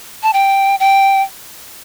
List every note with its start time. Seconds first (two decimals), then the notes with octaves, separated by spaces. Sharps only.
0.23 A5
0.33 G5
0.80 G5